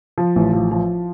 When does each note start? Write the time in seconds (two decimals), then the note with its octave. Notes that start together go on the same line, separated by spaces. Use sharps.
0.18 F3
0.36 A1
0.53 F3
0.71 F3